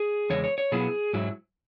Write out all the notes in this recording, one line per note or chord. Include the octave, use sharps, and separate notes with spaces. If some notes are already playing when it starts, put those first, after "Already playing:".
Already playing: G#4
E2 C#3 G#3 C#5
C#5
C#5
B2 F#3 B3 E4 G#4
G#2 F#3 E4